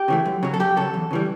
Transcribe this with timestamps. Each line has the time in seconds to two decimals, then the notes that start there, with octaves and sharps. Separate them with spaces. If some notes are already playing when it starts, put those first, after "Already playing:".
Already playing: G4
0.08 C#3 E3 A3
0.26 F#2
0.43 C#3 F#3
0.54 A4
0.59 F#2 G4
0.77 C#3 F#3 A4
0.94 E2
1.11 C#3 E3 G3